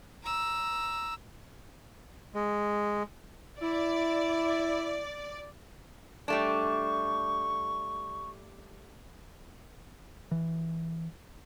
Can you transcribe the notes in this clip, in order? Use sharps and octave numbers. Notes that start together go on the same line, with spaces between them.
A#5 E6
G#3
E4 D5
G3 A3 D4 C#6
E3